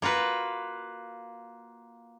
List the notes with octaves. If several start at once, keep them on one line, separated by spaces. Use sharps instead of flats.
A#3 F4 F#4 B4